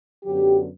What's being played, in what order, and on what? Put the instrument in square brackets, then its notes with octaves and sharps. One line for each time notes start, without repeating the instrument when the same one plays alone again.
[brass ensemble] F#2 D3 F#3 B3 G4